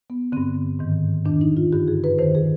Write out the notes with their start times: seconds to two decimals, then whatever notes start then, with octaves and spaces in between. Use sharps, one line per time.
0.10 B3
0.32 G2 D3 C4
0.79 G#2 D#3
1.25 F2 D#3 D4
1.41 D#4
1.57 F4
1.73 G2 D3 G4
1.88 G#4
2.04 B4
2.18 F2 D#3 C5
2.35 G#4